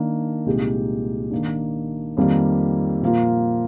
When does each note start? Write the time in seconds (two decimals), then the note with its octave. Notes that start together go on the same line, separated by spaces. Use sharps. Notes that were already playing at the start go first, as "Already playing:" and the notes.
Already playing: D#3 A#3 D4
0.46 C2 A#2 G#3 D#4 G4
1.31 D#3 A#3 D4
2.17 F2 D#3 G3 A#3
3.02 A#2 F3 A#3 F4